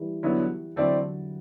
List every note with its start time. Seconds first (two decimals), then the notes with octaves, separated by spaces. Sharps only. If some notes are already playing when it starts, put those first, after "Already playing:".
Already playing: E3 G3
0.23 D3 F#3 B3 E4
0.76 D3 F#3 A3 C4 E4 A4 D5